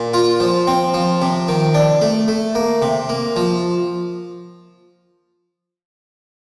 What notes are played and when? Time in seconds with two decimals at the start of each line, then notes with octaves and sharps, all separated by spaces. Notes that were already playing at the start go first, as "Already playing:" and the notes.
Already playing: A#2
0.14 F4
0.40 F3
0.67 C4
0.94 F3
1.22 C3
1.48 D#3
1.74 D4
2.01 A3
2.28 A3
2.55 A#3
2.82 C3
3.09 A#3
3.36 F3